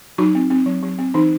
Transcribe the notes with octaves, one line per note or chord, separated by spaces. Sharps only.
F#3 D#4 F#4
C4
C4
F#3
F#3
C4
E3 D#4